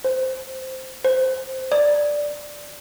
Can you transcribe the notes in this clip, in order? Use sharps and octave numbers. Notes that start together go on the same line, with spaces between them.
C5
C5
D5